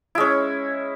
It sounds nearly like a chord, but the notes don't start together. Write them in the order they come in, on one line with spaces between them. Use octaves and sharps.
E4 G#3 C#4